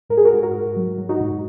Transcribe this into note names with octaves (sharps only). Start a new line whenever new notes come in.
G#2 A#4
G#4
F#4 A#4
G#2
F#4 A#4
G#2
F#3
F#3
D#4 F#4
G#2